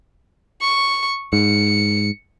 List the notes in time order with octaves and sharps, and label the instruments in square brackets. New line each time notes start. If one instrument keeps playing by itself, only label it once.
[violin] C#6
[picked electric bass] G#2 [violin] C#7